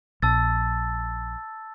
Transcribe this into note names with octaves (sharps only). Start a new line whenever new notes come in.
A#1 A5 E6 A6